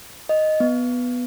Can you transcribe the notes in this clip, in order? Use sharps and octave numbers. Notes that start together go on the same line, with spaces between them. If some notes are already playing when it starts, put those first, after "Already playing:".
D#5
B3